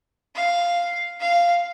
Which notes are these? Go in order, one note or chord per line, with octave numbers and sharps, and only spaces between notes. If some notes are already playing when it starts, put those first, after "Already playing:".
F5
F5